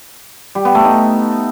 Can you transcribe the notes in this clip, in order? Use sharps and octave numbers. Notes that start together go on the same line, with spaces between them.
G3
B3
A3
D#4